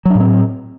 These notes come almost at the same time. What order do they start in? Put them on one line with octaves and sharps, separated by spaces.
F#3 D4 A2 C4